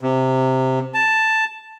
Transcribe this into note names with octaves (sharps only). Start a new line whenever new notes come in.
C3
A5